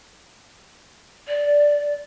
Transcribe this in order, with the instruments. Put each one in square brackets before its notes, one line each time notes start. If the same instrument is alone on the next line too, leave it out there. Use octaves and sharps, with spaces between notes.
[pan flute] D5